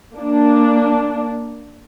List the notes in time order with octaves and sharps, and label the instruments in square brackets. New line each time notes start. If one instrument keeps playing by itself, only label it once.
[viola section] A#3 D4